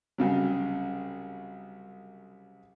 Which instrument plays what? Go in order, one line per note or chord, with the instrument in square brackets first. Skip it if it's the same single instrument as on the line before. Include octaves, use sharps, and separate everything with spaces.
[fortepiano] C2 C#3 F#3